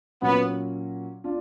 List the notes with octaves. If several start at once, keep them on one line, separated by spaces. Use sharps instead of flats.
A#2 F#3 A#3 B3 C#4 F#4
D4 F4